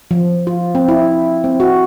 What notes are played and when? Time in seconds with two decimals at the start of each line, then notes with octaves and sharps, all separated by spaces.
0.11 F3
0.47 F4
0.75 C4
0.89 E4
1.44 C4
1.60 F#4